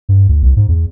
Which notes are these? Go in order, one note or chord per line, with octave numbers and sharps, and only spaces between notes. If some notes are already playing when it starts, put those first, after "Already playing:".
G2
D2
C2
G#2
E2